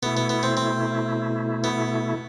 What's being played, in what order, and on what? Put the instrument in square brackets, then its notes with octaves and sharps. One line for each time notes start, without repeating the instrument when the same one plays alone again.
[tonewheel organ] B2 A3 E4 [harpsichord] B3
[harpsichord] B3
B3
C4
C4
B3